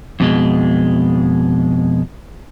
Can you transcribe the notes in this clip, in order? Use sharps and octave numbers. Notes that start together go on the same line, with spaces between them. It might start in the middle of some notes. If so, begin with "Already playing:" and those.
F2 B2 G#3